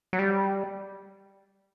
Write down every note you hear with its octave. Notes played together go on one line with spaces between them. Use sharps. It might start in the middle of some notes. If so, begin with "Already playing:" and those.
F#3
G3